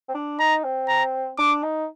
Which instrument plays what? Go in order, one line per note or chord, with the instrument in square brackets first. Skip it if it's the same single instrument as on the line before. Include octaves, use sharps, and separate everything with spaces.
[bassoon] C4
D4
[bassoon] D#4 [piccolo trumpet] A#5
[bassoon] C4
[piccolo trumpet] A#5
[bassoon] D4 [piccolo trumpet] D6
[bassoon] D#4